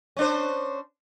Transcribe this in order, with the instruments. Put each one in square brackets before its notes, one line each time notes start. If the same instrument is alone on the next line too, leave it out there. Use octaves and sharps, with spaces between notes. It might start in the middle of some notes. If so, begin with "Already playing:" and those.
[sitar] C#4 D4 C5